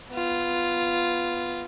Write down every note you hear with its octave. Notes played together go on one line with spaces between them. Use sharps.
B3 F4